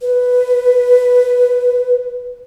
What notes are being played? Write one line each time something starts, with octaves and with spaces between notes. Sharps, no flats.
B4